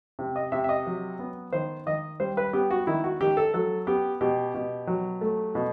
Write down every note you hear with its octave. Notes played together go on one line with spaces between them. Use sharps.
C3
D#5
C3 E5
E5
D#5
F#3
B3
D#3 C5
D#3 D#5
G3 C5
B4
B3 G4
F#4
D#3 E4
F#4
D#3 G4
A4
F#3 A4
B3 G4
B2 G4
B2
F#3
A3
B2